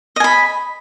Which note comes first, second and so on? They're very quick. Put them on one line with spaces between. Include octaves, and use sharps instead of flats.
D#5 G#5 B5